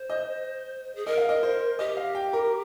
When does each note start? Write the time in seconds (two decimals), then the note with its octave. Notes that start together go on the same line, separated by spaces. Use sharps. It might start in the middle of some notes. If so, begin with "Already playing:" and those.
Already playing: C5
0.10 D#5
0.95 G#4
1.06 A#4 D#5
1.17 F5
1.29 D#5
1.43 C5
1.79 G4 D#5
1.97 F5
2.15 G5
2.33 A#4